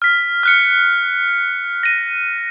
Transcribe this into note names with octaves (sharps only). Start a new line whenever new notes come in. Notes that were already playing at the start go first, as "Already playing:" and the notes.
F6 B6
F6 F#6 C#7
A#6 D#7